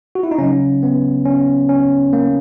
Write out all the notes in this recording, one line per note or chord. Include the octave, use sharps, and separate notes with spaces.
F#4
E4
D#4
C#3 F#3 C#4
B3
C#4
C#4
A#3